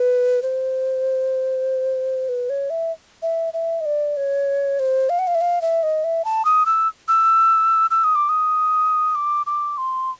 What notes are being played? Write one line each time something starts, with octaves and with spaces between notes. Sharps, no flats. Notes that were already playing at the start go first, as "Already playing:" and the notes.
Already playing: B4
C5
B4
C#5
E5
E5
E5
D#5
D5
C#5
C5
F5
F#5
F5
E5
F5
E5
D#5
E5
A5
D#6
E6
E6
E6
D#6
D6
D#6
D6
D6
C6